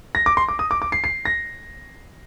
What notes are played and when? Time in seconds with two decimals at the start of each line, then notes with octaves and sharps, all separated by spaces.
0.15 A#6
0.26 D6
0.37 C6
0.49 D6
0.59 D#6
0.71 D6
0.82 D6
0.92 C7
1.04 C7
1.25 A#6